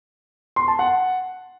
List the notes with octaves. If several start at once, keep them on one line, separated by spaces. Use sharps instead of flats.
C6
A5
F#5